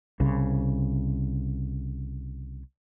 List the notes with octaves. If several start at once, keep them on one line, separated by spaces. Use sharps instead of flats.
C2 C#3